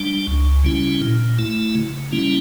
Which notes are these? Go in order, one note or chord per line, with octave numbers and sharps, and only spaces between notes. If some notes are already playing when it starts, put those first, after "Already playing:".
Already playing: G3 D4
C#2
C#3 G3 C#4 E4
A#2
A3 E4
C#3
G3 A#3 C#4 E4